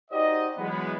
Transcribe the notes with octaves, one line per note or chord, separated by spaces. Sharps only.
D#4 F#4 G4 C5 D5 D#5
E3 F#3 G#3 B3